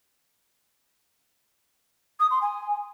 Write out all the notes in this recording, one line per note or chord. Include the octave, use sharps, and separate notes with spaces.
D#6
C6
G#5